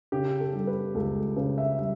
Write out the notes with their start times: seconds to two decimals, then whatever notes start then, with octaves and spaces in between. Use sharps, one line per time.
0.12 C#3 G4
0.40 A4
0.53 G3
0.67 B4
0.95 C#2 A4
1.36 C#3 B4
1.58 E5
1.79 G3 E5